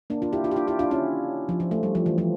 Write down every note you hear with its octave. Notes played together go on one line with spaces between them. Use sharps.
A#3 D4
D4 F4
E4 G4
D4 F4
G4
D4 F4
E4 G4
D4 F4
C#4 E4
F3
F3
A3
G3
F3
E3
F3